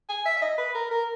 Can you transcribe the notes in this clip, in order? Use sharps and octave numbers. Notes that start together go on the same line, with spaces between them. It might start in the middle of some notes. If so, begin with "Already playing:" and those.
G#5
E5
E5
D#5
B4
A#4
A#4